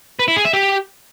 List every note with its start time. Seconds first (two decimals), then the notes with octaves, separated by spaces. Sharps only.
0.19 B4
0.28 E4
0.36 G#4
0.45 E5
0.53 G4